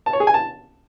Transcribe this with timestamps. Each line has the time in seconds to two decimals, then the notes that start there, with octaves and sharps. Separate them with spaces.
0.06 A5
0.13 C#5
0.20 G#4
0.27 G#5
0.34 A5